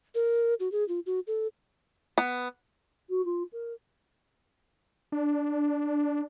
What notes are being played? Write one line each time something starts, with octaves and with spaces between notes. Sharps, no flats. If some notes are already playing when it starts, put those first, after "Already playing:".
A#4
F#4
G#4
F4
F#4
A4
B3
F#4
F4
A#4
D4